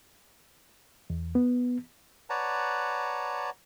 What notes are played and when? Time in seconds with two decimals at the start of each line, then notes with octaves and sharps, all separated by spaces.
1.10 E2
1.35 B3
2.30 B4 C#5 D5 F#5 A5 A#5